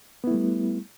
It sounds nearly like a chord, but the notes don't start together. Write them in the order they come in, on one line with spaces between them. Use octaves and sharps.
B3 E4 A3 G3